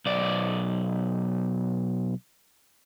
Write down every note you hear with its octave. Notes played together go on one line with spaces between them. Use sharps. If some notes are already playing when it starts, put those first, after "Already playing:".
B1 D5